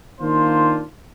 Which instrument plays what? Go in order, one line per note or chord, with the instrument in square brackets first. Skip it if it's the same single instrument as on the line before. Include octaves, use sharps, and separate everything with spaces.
[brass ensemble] D#3 A#3 D4 F4 C5